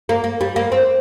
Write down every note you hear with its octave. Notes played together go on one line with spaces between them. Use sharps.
A#3
A#3
G3
A#3
C4